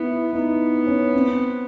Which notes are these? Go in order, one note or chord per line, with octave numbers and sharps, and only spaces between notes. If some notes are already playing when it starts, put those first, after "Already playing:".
Already playing: B3 E4
B3 D#4
C#4
C4